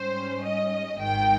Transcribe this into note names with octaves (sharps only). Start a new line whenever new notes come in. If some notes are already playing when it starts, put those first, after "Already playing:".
Already playing: G#2 G3 C#4 C5
D#5
G#1 G#2 D#3 G5